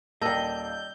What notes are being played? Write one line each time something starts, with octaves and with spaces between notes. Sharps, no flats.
D#1 A#3 D5 D#5 G5 A5 E6 G6